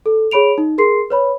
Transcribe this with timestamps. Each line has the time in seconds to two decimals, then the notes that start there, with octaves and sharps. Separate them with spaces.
0.06 A4
0.31 G#4 C#5 B5 D7 F7
0.58 D#4
0.78 G#4 A#4 C6 C7
1.10 B4 C#5 B5